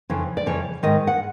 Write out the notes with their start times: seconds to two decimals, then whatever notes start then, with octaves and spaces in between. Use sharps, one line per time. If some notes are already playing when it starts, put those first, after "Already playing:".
0.10 F2 C#3 E3
0.37 D5
0.46 F2 C#3 E3 C#5
0.83 G#2 D#3 D#5
1.07 F#5